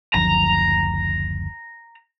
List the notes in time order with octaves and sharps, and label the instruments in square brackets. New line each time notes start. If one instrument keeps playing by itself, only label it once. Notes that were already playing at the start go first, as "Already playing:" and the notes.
[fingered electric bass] F#1 D2 F3 [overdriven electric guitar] A#5